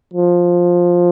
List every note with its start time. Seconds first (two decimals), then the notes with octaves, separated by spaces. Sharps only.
0.14 F3